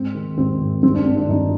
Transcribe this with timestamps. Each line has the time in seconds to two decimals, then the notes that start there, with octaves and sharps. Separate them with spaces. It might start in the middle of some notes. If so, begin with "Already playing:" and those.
Already playing: G#2 C4
0.15 D#3
0.38 G#1 C4
0.61 G#1
0.83 G2 C4
0.95 D4
1.06 D#3 C4
1.17 D4
1.29 G1 D#4